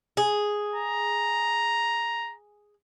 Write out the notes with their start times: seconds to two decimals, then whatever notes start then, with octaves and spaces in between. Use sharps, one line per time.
0.17 G#4
0.76 A#5